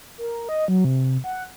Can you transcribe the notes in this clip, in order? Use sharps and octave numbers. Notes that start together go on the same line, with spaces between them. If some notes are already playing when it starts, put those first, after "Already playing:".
A#4
D#5
F#3
C3
F#5